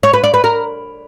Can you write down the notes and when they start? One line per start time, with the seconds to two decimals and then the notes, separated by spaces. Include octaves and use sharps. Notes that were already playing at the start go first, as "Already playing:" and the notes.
0.03 C#5
0.13 B4
0.24 D5
0.34 B4
0.44 A#4